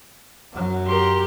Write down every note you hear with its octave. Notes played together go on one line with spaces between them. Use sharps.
F#2 F#3
G4 A#4 C6